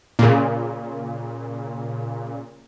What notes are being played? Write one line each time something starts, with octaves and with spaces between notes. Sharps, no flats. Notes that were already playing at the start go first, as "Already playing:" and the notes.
A#2 C#3